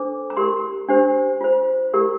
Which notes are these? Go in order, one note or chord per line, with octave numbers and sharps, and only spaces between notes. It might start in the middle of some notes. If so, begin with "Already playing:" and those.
Already playing: D4 A4 C5 D6
A#5
E4 G4 A#4 C6
D4 G4 C5
F4 C5
E4 G4 A#4